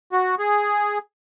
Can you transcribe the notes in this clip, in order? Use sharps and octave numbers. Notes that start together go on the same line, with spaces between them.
F#4
G#4